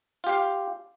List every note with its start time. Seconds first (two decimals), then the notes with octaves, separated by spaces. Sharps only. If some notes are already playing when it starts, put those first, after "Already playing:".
0.24 F4
0.27 G4
0.29 F5